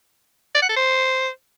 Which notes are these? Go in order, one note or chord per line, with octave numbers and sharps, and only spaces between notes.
D5
F#5
A4
C5